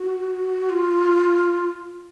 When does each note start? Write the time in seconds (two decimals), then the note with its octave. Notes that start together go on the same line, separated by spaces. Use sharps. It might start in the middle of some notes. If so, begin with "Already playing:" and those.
Already playing: F#4
0.70 F4